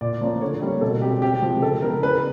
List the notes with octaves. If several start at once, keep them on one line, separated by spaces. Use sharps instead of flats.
A#2 D5
F3 A#3 C#4
D3 C#5
G3 A#3 C#4
B2 A4
G#3 C4 G4
C3 G4
F3 G#3
C#3 A4
E3 G#3 B3 A#4
C#3 B4